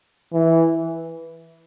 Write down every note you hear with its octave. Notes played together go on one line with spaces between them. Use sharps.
E3